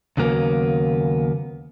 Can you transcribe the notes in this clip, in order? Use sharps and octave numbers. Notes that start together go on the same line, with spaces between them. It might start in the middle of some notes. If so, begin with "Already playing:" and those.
D#2 C#3 F#3 A#3 B3